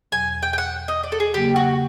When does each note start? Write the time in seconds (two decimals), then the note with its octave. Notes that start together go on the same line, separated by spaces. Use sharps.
0.12 E2 B2 F#3 G#5
0.42 G5
0.53 G5
0.58 F#5
0.88 D#5
1.03 D5
1.12 A4
1.20 G#4
1.34 C#3 F#3 A#3 G4
1.56 F#4